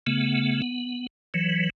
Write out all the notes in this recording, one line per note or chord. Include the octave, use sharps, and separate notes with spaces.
C#3 A3 B3
B3
E3 F#3